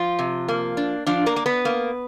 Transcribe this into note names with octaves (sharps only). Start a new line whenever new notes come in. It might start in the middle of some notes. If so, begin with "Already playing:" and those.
Already playing: F3 F4
C3
A#3
D4
F3 D4 F4
A#3 A#4
A#3
B3 B4
A#3